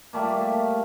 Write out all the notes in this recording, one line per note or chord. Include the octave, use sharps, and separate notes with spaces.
G3 A3 A#3